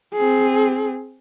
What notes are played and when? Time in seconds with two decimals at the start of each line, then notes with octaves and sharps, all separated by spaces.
0.15 C4 G#4